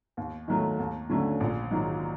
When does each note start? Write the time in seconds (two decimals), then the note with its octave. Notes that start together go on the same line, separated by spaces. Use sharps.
0.17 D#2
0.48 D#3 F#3 A3
0.79 D#2
1.10 D3 F#3 A3 C#4
1.40 A#1
1.71 G#2 D#3 F#3